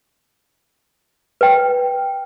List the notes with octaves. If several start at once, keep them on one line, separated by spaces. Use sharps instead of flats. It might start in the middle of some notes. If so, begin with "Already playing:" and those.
B4 G5